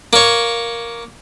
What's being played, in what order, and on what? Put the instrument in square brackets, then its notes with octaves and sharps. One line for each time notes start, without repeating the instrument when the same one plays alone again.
[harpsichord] A#3 C#5